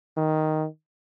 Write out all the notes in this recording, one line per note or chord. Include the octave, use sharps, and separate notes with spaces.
D#3